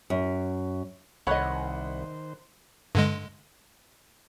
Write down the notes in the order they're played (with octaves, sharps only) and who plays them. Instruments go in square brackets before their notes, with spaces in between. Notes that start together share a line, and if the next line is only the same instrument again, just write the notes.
[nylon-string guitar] F#2
[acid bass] C2 [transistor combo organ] D#3 C5 [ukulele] C#5 D#5 [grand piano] F#5 B5 F#6
[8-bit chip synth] G2 D3 G#3